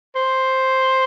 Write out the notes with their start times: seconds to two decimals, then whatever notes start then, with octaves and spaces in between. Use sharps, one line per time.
0.16 C5